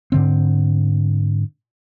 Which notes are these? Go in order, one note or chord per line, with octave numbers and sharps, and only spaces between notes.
G#2 D3 C4